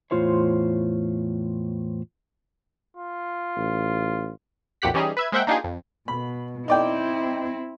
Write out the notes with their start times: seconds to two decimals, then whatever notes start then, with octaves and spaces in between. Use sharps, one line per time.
0.11 E2 A2 F4 C5 C#5
2.97 F4
3.56 A1
4.82 B1 F2 A#2 G4 F#5 B6
4.94 E3 G3 C#4 D#4 G4 G#4
5.17 B4 E5 G#6
5.32 G#3 A#3 C5 E5 F#5 G5
5.47 A#3 D4 D#4 F4 G4 G#4
5.64 F2
6.08 B2 B5
6.68 C4 D#4 E4 D5 G5